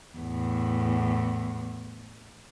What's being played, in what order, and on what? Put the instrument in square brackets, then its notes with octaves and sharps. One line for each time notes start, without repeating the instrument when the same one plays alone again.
[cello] E2 A2